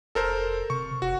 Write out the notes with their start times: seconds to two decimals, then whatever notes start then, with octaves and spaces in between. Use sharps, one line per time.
0.15 F1 A4 A#4 C5
0.70 C3 C#6
1.02 F#1 F#4